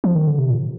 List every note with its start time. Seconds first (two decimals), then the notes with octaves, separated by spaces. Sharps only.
0.04 F3
0.15 D#3
0.27 D3
0.38 C3
0.50 A#2